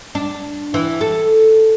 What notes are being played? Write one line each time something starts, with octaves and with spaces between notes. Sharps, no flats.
D4
E3
A4